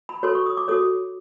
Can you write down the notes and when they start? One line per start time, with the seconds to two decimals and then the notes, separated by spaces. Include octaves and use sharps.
0.09 B5
0.23 F#4 A4 C#5 C6
0.35 C#6
0.46 D#6
0.57 D6
0.68 F#4 A4 C#5 D#6